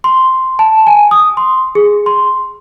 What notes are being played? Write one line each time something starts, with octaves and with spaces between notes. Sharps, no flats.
C6
A5
G#5
D#6
C6
G#4
C6